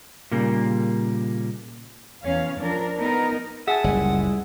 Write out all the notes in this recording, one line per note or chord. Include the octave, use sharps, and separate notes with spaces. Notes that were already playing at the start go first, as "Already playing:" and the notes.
A#2 C#3 G3 A#3
E2 C#4 F5
F3 D4 A#4
B3 D#4 A#4
G#4 E5 F#5 G#5 A5
F#1 C#2 G3 G#3 E4